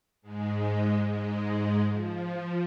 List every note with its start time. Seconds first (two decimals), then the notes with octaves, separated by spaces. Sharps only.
0.22 G#2 G#3
1.05 G#2 G#3
1.89 F3